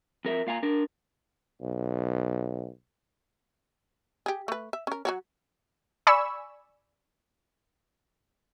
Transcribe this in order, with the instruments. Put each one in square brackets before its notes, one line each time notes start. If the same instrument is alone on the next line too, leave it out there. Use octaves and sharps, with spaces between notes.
[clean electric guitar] F2 A#4 E5
A#2 F5 G#5 A#5
D4 A#4
[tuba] B1
[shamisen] G4 G#4
A3 B4
E5
C#4 A#4
F#3 F#4 C#5
[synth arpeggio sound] D5 G#5 B5 C#6 E6